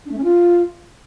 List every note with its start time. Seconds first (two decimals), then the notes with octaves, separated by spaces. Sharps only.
0.05 D4
0.11 A3
0.18 C#4
0.24 F4